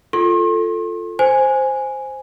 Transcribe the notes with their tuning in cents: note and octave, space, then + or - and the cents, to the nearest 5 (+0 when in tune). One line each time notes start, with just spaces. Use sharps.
F4 +0 A4 +0 C6 +40
C5 +0 G#5 +0